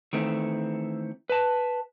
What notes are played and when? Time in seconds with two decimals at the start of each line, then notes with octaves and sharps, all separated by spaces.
0.13 D#3 E3 A3 C4 E4
1.30 B4 A5